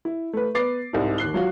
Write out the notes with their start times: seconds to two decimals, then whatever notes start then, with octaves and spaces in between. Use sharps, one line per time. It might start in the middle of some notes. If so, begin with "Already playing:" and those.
0.05 E4
0.33 A3 B4
0.55 B3 B4 D6 A6 C7
0.93 C2 G#2
1.18 D#2 F#6 C7 G7
1.34 F#3 F4 F#4